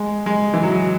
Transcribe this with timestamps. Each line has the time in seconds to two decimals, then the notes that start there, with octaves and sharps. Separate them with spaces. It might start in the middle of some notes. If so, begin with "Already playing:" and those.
Already playing: G#3
0.26 G#3
0.54 E3
0.63 F#3